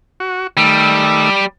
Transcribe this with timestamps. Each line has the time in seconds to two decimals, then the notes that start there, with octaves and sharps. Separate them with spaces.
0.20 F#4
0.57 D#3 G3 A3 E6